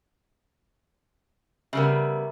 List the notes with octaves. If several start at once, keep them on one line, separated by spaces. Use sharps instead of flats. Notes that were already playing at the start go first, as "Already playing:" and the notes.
C#3 G3 B3 A#4 E5